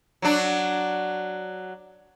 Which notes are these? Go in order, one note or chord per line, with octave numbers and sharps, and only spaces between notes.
F#3 D4